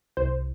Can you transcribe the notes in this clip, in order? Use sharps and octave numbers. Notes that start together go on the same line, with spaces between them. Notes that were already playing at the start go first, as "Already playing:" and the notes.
C2 C5